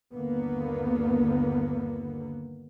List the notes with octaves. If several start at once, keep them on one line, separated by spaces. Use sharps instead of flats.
G1 D#2 D3 A#3 B3